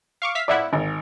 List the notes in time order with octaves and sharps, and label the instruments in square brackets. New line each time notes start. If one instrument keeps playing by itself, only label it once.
[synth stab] F5 C#6 D6
E5 F5 B6
[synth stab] A2 F3 E4 [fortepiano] D5 E5 F#5
[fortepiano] G#1